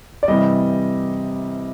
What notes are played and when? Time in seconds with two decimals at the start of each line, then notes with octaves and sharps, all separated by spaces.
0.23 D5
0.28 C3 E3 G3 D#5